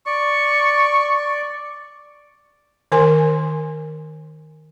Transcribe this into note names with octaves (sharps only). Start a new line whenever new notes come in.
D5 C#6
D#3 A#4 G#5 C6